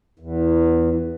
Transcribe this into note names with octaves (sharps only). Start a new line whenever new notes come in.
E2